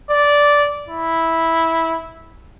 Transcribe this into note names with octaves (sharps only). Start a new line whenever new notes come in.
D5
E4